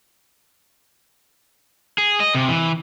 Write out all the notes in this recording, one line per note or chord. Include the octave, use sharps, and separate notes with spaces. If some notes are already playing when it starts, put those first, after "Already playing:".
G#4
D#5
C3
E3